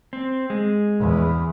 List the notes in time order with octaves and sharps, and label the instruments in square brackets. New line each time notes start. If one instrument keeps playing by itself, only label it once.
[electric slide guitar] C4
G#3
[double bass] E2